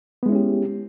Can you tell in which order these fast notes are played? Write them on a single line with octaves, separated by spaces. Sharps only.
B3 G#3 E4 C#4 G4